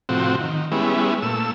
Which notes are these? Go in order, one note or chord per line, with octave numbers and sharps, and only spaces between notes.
A2 C3 F3 C4 F#4
D#3
G3 G#3 B3 C#4 E4
A#2 A3 E6